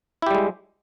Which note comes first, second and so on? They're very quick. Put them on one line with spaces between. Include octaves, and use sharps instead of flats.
E4 G4 G3 G#3